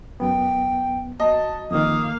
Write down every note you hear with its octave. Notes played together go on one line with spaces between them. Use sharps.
F#2 B3 G5
F#3 D#5 A5
F2 D#3 A#3 F5 D#6